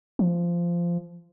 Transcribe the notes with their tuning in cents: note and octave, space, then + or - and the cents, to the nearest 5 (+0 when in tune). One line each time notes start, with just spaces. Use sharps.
F3 -15